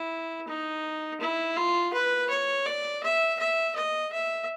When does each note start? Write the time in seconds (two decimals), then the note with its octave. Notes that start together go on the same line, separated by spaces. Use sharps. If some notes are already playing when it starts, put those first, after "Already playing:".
Already playing: E4
0.48 D#4
1.21 E4
1.57 F4
1.94 B4
2.30 C#5
2.66 D5
3.03 E5
3.39 E5
3.76 D#5
4.12 E5